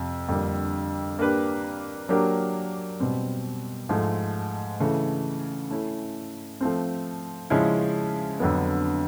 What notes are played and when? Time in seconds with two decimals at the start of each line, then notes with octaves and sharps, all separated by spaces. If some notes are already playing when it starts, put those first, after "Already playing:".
Already playing: F2 C3 F3
0.29 F2 D3 G3 A#3
1.19 A#3 D4 G4 B4
2.09 F#3 A#3 D4 G4 A#4
3.00 B2 G3 C4
3.89 G#2 F3 A3
4.80 C#3 E3 A3
5.71 A3 C#4 E4
6.61 F3 A3 C4
7.50 C#3 F3 G#3 C#4 E4
8.40 F2 D3 F#3 B3